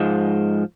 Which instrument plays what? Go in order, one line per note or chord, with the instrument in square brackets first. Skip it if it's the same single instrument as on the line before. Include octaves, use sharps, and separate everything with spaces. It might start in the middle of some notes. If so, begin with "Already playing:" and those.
Already playing: [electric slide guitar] G#2 F3 G#3